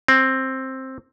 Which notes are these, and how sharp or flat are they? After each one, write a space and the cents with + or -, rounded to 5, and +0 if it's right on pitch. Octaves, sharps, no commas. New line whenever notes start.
C4 +10